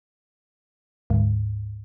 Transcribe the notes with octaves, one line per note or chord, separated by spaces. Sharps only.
D2 G#2